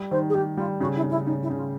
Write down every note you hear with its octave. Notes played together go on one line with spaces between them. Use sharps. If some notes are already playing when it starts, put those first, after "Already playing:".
Already playing: G3
D#3 C5
G#4
D#3 G4
G3 F4
C#3 F#4
E4
C#3
E4
C#3 D#4
E4
C#3
F4